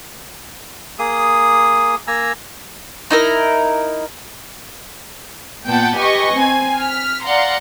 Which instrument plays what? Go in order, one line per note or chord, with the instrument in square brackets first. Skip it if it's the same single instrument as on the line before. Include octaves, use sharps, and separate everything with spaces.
[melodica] A#3 G#4 D#6
A#3 G#5 A#5 E6
[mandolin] D#4 E4 A#4
[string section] A#2 B3 F#5 G5 A5
G4 B4 D#5 G#5 C#6
C4 G#5
F6 B6
D5 F5 F#5 A#5 C6